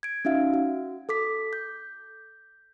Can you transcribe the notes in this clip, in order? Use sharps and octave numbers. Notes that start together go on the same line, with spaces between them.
G#6 D7
C#4 D#4 F#4 E5 F5
F#4
A4 D6 B6
G6